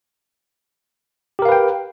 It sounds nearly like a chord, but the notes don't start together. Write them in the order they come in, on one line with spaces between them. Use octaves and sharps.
G4 A#4 F5 B4 G5